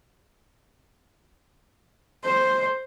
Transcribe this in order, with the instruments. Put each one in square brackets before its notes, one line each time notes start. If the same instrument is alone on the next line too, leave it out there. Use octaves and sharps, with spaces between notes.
[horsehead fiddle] C5